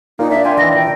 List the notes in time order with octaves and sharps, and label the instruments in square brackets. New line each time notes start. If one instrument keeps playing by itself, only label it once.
[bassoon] A#2 [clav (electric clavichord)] A#3 [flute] D#4
[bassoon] D4 [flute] E5
[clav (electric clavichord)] F5 G5 G#5 [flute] C6
[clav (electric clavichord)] D#3 E3 [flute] A#6
[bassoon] A#2 [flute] G5